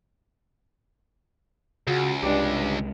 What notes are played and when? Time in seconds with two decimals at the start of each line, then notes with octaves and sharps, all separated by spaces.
1.87 C#2 C#3 F#4
2.23 C2 G2 G#3 D4 G4